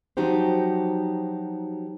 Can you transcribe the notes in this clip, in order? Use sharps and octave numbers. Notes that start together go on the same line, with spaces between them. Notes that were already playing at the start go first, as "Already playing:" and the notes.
F3 F#3 D#4 F#4 G4 C5